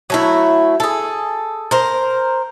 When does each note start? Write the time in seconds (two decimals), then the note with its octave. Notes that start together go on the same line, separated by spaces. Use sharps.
0.10 F#3 A3 E4
0.80 G#4 A4
1.71 A#4 C5